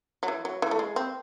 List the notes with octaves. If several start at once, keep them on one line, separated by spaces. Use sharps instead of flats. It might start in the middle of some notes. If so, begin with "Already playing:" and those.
F#3
E3
F#3
E3
A3
G#3
C4